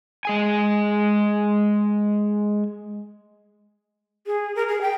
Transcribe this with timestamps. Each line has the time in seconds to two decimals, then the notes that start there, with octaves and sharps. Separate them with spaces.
0.25 G#3 G#4 G#5
4.26 G#4
4.55 A#4
4.68 G#4
4.81 G5